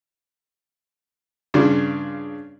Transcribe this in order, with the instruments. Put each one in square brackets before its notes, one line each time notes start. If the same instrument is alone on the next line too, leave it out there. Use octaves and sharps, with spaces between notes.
[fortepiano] G2 C#3 D4 F4